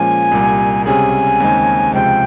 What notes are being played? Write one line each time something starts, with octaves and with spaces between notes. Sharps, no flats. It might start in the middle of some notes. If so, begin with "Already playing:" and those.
Already playing: A#2 F3 G#3 C#4 G#5
C2 A#2 G3
C#2 C3 G3 C#4 G#4 G#5
D#2 C#3 G#3 C4 D#4
C#2 C3 F3 G#3 G5